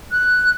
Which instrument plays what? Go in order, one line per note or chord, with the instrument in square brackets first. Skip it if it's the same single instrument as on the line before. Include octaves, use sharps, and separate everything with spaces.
[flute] F#6